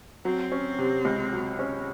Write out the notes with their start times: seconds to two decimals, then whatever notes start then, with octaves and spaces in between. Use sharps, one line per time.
0.25 F#3 C4
0.52 C#4
0.78 C3
1.05 C#2
1.33 F#3
1.59 C#4